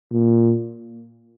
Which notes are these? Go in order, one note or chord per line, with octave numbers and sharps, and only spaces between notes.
A#2